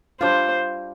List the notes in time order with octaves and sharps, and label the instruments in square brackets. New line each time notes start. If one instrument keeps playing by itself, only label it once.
[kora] G3 D4 F4 [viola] C5